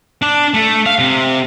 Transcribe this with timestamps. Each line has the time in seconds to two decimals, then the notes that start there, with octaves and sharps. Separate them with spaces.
0.22 D4
0.54 A3
0.86 F5
0.99 C3